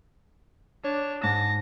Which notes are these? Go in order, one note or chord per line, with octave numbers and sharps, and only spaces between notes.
D4 C#5
G#2 A5 A#6